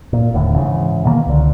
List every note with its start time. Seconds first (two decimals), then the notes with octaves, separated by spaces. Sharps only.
0.13 A#2
0.33 D1 D#2 A2 D3
0.56 G#2 C#3 E3
1.04 B2 D#3 F#3 A#3
1.26 C#2 D3